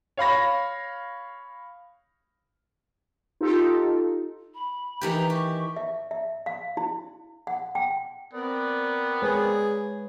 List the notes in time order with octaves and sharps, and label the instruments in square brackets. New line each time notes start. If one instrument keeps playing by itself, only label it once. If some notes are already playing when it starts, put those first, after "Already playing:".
[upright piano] C#5 F5 B5 A#6
[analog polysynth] D#4 F4 G4 A4
[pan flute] B5
[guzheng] D#3 E3 G4 [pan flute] A#5
[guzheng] G4 [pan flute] C#6
[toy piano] E5
E5
F5
E4
F#5
G5
[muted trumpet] B3 [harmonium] C4 A#4 D5
[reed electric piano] G#3 B4 C#5 [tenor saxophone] G#4